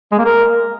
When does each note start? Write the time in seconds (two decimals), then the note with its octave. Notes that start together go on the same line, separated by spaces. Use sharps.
0.12 G#3
0.18 A#3
0.25 A#4